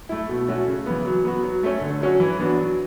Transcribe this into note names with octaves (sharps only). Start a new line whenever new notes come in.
A3 E4
B2
A3 C#4 F#4
C#3
E3 B3
F#3
B3 F#4
F#3
A3 C#4
D3
F#3 C#4 F#4
E3
B3 D4 F#4
F#3